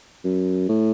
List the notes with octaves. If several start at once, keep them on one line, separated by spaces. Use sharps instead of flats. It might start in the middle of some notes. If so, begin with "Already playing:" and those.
F#2
A2